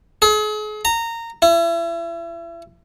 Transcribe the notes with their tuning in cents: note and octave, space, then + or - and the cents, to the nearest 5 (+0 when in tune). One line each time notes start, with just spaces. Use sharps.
G#4 +40
A#5 -20
E4 +35